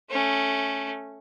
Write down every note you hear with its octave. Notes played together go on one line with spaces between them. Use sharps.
A3 C#4